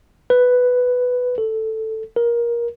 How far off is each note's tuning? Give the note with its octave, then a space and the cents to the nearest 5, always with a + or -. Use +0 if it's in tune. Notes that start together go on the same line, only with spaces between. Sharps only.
B4 +5
A4 +5
A#4 +20